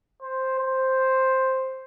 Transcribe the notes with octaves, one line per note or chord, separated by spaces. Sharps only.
C5
C5